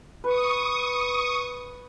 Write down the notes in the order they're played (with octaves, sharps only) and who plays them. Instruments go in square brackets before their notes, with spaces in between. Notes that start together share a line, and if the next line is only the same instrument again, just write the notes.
[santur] B4 [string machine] C#6 D#6